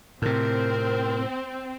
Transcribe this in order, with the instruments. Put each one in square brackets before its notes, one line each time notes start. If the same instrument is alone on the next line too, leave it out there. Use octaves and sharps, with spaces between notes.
[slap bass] A2 C3 [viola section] C4 [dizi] A#4